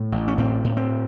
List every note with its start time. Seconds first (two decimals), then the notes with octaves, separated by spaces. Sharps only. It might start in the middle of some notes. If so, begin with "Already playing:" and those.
Already playing: A2
0.12 A1
0.28 C#4
0.38 A2 C4
0.64 A2
0.77 C4